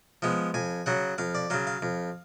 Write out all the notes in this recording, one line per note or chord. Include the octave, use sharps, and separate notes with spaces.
F3 G#3 B3
F2 G#5
C#3 F#3 F#5
F2 F5
D5
C#3 F#3 F5
F5
F2